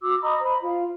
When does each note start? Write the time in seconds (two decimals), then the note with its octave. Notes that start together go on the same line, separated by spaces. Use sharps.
0.03 F#4 D6 E6
0.21 D#5 A#5 B5 D#6
0.40 C5 B5
0.61 F4